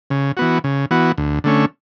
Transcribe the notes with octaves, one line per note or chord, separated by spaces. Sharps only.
C#3
E3 B3 F#4
C#3
E3 B3 F#4
D2
D3 A3 C#4